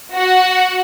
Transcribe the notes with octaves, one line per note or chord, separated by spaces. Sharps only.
F#4 F#5